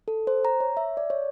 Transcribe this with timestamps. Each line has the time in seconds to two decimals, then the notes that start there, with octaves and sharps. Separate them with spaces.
0.08 A4
0.27 C5
0.45 A#5
0.60 C#5
0.77 E5
0.97 D5
1.10 C#5